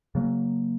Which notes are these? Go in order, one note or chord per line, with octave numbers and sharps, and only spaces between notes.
C#3 F#3 A#3